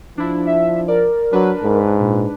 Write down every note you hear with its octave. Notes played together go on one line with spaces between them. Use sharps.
F3 D4 E4
E5
A#4 D5
F#3 D4 B4
G#2
A#2